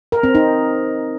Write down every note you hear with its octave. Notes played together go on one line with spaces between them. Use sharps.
A#4
C4
D#4